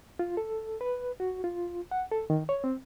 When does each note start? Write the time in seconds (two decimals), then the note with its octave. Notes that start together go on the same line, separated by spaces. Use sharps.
0.19 F4
0.37 A4
0.81 B4
1.20 F#4
1.44 F4
1.91 F#5
2.11 A4
2.30 D#3
2.49 C#5
2.64 C4